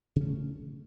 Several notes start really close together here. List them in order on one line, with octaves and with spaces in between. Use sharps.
C#3 C#4 A3